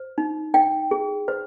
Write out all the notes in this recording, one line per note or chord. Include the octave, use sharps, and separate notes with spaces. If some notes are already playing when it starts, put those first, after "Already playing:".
Already playing: C5
D#4
D#4 G5
G#4
C5